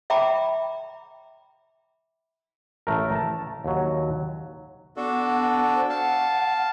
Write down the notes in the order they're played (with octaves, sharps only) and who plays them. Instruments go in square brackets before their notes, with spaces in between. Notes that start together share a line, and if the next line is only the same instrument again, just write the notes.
[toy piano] E5 G5 A#5 B5 D6
[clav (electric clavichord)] A1 A3 A#4
A5
D#2 F#3
[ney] B3 [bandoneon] D4 F#4 A4
[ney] C5
[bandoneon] F5 A5 [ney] F#5